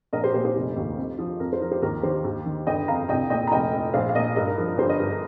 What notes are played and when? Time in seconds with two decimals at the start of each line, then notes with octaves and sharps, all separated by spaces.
0.13 A#1 A#4 D#5
0.23 G4 C5
0.34 A#2 G4 C5
0.45 G4 C5
0.56 F1
0.76 D#2
0.97 F2
1.18 F3
1.40 F2 A#4
1.53 C5
1.61 F3 A#4
1.71 G4 C5
1.82 D#2 A#4
2.03 D#3 G4 C5
2.24 D#2
2.46 D#3
2.67 G1 D#5 G5
2.88 F2 F5 A#5
3.09 C2 D#5 G5
3.30 A#2 D#5 G5
3.47 A#5
3.51 F1 D#5 G5
3.72 F2
3.94 A#1 C5 F5
4.09 F5
4.15 A#2 A#4 D#5
4.36 G2 A#4 D#5
4.47 A#4
4.58 F3 A#4
4.68 A#4
4.78 G1 G4 C5
4.89 A#4 D#5
5.00 G2 A#4
5.10 A#4